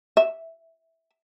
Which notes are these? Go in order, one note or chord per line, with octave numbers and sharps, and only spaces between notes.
E5